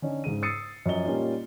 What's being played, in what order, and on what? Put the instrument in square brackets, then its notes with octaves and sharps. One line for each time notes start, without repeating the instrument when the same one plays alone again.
[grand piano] D3 C#4 D#4
G#2 C#3 G#4 D#7
D#6 E6 A6 C7 C#7 D#7
F#2 F3 D#5 G7
A#2 G3 A#3 C#4 D#4 F4